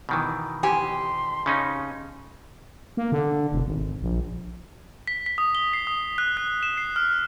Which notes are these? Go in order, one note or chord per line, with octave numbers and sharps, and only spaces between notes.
B2 D#3 E3
F2 G4 G#5 C6
C#3 C#4 D#4
A#3
D3
E1
G#1
A#1
B6
B6
D#6
G7
C7
D#6
F#6
F#6
E7
C7
F6